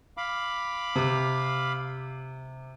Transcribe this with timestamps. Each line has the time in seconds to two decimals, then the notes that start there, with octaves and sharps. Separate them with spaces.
0.17 F5 B5 D6
0.96 C3